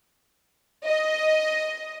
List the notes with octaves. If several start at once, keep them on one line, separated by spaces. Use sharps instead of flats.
D#5